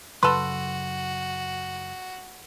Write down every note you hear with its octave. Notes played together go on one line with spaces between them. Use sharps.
F#2 C#3 F#3 F#4 A4 B4 C6